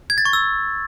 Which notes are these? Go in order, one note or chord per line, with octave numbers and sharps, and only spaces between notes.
G#6
A6
C#6
E6